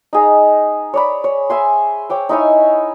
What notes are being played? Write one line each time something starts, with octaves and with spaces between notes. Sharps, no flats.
D#4 G#4 A#5
C#5 D5 B5
C#5
E5 G#5 C6
C#5 G5 D6
D#4 E4 C#5 G#5